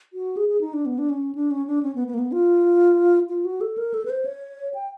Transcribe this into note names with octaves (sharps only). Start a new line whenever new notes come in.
F#4
G#4
G#4
D#4
D4
B3
D4
C#4
D4
C#4
D4
C#4
B3
B3
A#3
B3
F4
F4
F#4
A4
A#4
A4
B4
C5
C#5
G5